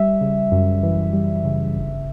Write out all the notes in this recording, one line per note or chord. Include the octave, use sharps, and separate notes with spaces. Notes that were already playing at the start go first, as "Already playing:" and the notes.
Already playing: G3 E5
C#3
F#2
E3
G3
C#3
G1